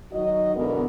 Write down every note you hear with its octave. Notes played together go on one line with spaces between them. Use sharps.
D#3 F#3 D#4 F#4 D#5
E2 B2 D3 G#3 B3 A#4